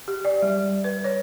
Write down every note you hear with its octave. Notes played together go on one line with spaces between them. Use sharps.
G4
D5
G3
B4
C#5